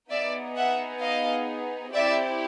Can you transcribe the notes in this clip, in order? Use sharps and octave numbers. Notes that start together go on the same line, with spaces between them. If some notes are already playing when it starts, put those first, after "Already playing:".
B3 D#4 G#4 D5 E5
E5 F#5
D#5 F5
C4 E4 G4 D5 E5